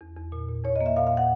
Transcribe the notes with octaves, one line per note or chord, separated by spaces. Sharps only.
E2
E2
A#2
A#2
E2 C#5
D#5
A#3
E5
A#2 F5
F5
A#2
F#5